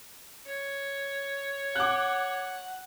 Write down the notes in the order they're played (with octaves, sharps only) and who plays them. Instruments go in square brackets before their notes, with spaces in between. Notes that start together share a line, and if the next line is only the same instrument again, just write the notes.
[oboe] C#5
[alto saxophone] F#5 [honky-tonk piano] D6 F#6